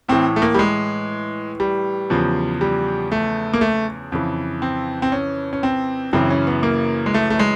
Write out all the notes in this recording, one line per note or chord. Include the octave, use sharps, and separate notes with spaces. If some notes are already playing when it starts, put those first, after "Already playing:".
A2 E3 C4
A3
A#3
G3
G#3
G3
E2 C#3 F3
G3
A3
A#3
A3
F2 C#3 E3
C4
C4
C#4
C#4
C4
F#2 C#3 E3 C4
C#4
B3
A#3
G#3
A3
A3
G#3